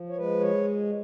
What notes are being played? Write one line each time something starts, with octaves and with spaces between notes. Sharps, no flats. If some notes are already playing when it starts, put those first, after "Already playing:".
Already playing: F3
C#5
G#3 B4
C#5